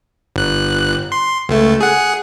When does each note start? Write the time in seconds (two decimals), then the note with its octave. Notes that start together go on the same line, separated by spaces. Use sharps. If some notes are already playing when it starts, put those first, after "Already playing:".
0.36 G1 F#6
1.12 C6
1.49 C#2 A3
1.81 G#4 F#5